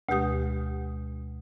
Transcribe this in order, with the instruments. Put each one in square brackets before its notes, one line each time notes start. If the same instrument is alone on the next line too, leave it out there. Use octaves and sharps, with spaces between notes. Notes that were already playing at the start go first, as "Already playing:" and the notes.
[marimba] D2 B2 G#3 G4 D#6